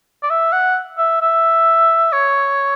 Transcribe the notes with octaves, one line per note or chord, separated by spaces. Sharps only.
D5
E5
F#5
E5
E5
C#5